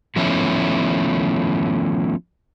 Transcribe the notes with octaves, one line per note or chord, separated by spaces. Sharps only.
D#3 F3 A3 B3 C#4 E4